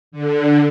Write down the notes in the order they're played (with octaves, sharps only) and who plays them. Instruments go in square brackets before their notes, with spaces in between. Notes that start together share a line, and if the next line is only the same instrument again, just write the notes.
[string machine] D3